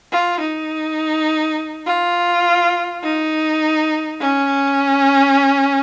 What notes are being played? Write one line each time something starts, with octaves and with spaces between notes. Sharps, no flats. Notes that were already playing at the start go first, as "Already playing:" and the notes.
F4
D#4
F4
D#4
C#4